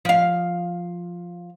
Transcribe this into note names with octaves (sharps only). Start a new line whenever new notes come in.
F3 F5